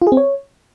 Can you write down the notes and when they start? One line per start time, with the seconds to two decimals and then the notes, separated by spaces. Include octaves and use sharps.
0.02 F4
0.07 G#4
0.12 C4
0.17 C#5